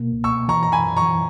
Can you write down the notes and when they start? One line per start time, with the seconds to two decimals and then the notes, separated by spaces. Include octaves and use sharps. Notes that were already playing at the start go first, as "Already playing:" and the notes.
Already playing: B2 A#3
0.12 C#2
0.24 C#6 E6
0.30 B2
0.48 E3 A#5 C#6
0.63 F#2 A#5
0.72 G#5 B5
0.84 F#2
0.97 A#5 C#6
1.02 E3